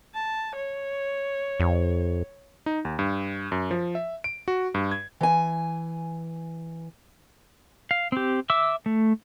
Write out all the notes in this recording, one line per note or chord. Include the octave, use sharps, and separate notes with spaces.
A5
C#5
F2
D#4
D#2
G2
F#2
F3
E5
D7
F#4
G2
G#6
E3 G#5
F5
C4 G4
E5 D6 E6
A3